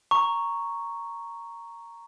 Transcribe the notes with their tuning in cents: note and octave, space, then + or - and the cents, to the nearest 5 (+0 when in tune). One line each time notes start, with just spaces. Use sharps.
A#5 -5 C#6 +0